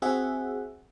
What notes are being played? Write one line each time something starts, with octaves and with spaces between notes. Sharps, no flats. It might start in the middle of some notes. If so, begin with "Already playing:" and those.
C4 F#4 G#4 E5 F#5